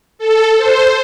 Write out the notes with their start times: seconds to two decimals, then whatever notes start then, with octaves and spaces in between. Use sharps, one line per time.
0.18 A4
0.57 C5